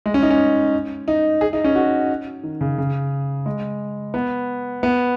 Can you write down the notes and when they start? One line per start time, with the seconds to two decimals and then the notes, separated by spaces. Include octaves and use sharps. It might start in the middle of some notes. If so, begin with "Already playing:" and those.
0.06 G#3
0.14 C#4
0.22 D#4
0.31 C#4
1.08 D#4
1.41 G#4
1.53 D#4
1.64 C#4
1.76 F#4
2.44 D#3
2.61 C#3
2.78 C#3
3.46 G#3
4.14 B3
4.83 B3